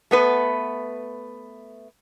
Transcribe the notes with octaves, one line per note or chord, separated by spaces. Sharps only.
A3 B3 B4